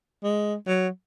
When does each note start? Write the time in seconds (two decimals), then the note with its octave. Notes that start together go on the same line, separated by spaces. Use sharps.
0.24 G#3
0.67 F#3